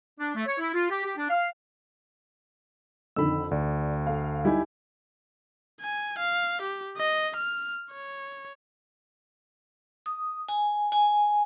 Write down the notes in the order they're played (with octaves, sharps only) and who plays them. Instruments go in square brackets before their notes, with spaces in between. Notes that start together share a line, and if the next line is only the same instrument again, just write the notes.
[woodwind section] D4
A3
C#5
E4
F4
G4
G4
D4
F5
[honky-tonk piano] F2 D3 D#3 [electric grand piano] B5 E6
[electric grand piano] D2 [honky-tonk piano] D5
[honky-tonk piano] A4 F5
[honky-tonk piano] G3 D#4 [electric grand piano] E4 G4 G#5
[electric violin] G#5
F5
G4
D#5
F6
C#5
[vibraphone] D#6
G#5
G#5